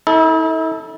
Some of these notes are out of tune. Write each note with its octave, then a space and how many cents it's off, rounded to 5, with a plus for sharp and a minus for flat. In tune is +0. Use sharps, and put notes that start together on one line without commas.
E4 -45 A4 +0